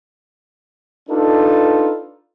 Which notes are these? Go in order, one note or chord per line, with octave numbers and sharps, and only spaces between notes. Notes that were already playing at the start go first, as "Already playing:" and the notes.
D4 D#4 F4 A4 B4